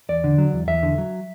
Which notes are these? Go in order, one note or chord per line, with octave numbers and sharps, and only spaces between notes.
E2 D5
D3
F#3
E2
E2 E5
D3
F#3